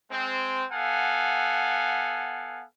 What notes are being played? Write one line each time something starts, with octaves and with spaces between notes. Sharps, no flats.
G#3 C4
B3 A4 F5 F#5 G#5